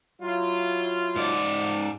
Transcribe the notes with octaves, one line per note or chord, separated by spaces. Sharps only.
F#3 E4 F4
G#2 D5